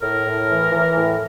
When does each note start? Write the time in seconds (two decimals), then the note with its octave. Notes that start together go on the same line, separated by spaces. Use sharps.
0.02 A2 A#4
0.25 A2
0.49 E3
0.72 E3
0.96 A2